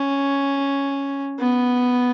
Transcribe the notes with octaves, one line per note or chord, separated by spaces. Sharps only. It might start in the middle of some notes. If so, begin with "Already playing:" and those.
Already playing: C#4
B3